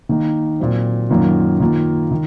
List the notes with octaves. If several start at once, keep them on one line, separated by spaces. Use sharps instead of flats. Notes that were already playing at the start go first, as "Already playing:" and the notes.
D#3 A#3 D#4
A#2 F#3 C4
F#2 D#3 A#3 F4
D#3 A#3 F4
D#3